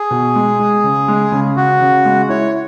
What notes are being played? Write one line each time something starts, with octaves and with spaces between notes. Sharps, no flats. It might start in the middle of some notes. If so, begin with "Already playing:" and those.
Already playing: G#4
B2
G#3
G#3
C#3
G#3
C#3
C#3 F#4
C#3
G#3
E4 C#5